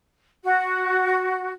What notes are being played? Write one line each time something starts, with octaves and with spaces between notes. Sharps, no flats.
F#4